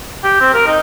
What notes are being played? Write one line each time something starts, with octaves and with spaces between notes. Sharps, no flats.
G4
C4
A#4
D#4